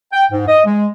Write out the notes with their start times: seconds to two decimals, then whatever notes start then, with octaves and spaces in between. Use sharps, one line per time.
0.13 G5
0.32 G#2
0.48 D#5
0.66 G#3